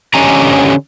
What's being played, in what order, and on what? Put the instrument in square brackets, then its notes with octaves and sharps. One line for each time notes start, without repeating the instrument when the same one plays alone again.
[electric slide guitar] D3 C#4 G4 D#5 G#5 A#5